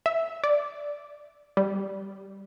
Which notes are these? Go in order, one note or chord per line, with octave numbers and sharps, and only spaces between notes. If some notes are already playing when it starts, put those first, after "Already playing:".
E5
D5
G3